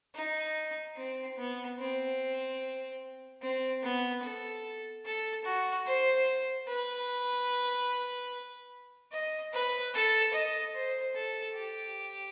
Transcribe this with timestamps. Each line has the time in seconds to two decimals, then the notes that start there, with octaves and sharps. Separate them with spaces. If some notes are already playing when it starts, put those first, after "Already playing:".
0.15 D#4
0.96 C4
1.37 B3
1.79 C4
3.42 C4
3.83 B3
4.23 A4
5.05 A4
5.44 F#4
5.86 C5
6.68 B4
9.12 D#5
9.53 B4
9.94 A4
10.34 D#5
10.74 C5
11.15 A4
11.56 G4